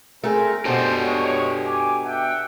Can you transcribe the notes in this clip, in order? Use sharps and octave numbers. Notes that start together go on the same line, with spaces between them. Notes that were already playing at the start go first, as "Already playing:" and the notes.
A3 C4 G#4 A#4
B2 D4 G4 A4 C5
G#3 C#5
G#5 D6
E5 F#5 G5